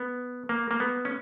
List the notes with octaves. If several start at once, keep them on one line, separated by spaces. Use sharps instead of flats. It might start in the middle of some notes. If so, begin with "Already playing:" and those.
Already playing: B3
A#3
A#3
B3
C#4